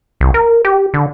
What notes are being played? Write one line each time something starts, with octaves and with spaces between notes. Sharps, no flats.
C2
A#4
G4
D3